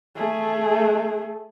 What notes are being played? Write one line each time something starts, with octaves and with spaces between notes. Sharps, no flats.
A3 G#4